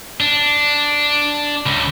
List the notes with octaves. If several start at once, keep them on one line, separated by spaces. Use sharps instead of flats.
D4
C#2